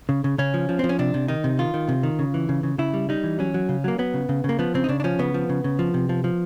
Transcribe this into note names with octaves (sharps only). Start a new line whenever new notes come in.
C#3
C#3
C#3 C#4
F3
F3
F3 C4
C#4
C3 D4
C3
D#3 D#4
C3
D#3 F4
D#3
C3
D#3
C#3
E3
C#3
C#3
C#3 E4
G3
G3 D#4
E3
F#3 C#4
F#3
C#3
F#3 A#3
F#3 B3
C#3
C#3
C#3 A#3
F3 B3
C#3 C4
D#4
C#3 D4
D4
F3 C#4
C#3 B3
F3
C#3
C#3
F3
C3
F3
F3